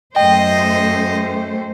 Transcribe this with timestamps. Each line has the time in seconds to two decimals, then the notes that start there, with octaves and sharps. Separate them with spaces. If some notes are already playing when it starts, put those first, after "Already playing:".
0.16 F#2 A3 C5 D#5 G5